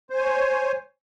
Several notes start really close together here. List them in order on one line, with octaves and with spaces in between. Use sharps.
C5 G#5 C#5